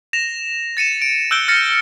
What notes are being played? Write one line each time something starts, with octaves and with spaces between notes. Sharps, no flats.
A#6 E7 F7
A6 C#7 D#7 E7
D7
E6 F#6 G6 D7 G7
F6 A6 A#6 C#7